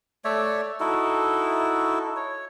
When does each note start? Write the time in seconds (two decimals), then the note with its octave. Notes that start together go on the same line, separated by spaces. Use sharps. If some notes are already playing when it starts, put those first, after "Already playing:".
0.25 A3 C#5 D5 E5
0.80 D#4 E4 F#4 A4
2.16 C#5